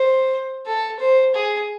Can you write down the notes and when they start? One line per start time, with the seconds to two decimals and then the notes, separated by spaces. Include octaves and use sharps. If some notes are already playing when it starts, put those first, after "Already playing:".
Already playing: C5
0.66 A4
1.00 C5
1.35 G#4